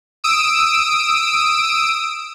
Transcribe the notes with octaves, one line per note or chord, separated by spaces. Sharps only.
D#6 E6 D7